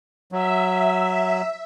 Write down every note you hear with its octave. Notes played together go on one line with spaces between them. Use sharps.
F#3 E5